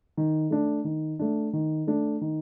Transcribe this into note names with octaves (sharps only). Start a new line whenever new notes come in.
D#3
A3 D4
D#3
A3 D4
D#3
A3 D4
D#3